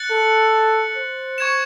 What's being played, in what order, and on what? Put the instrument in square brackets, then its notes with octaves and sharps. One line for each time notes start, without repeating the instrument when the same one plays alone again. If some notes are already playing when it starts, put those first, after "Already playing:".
Already playing: [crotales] F#6 A6 C#7 F#7
[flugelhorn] A4
C5
[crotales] C#6 G#6 C#7 E7